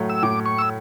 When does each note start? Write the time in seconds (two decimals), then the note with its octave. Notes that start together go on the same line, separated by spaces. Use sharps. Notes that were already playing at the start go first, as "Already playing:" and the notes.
Already playing: A2 F#3 A3
0.10 E6
0.23 A2 D6
0.46 C#6
0.59 E6